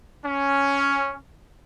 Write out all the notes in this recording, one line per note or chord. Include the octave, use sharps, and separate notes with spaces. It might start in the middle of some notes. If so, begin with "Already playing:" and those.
C#4